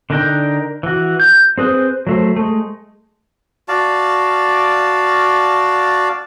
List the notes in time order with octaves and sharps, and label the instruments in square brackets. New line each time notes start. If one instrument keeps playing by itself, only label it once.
[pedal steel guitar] D3 D4 D#4 A#4 G5
E3 F#4
G6
C4 G#4 B4 C5
F#3 A3 C5
G#3 A3
[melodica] F#4 D5 F5 A5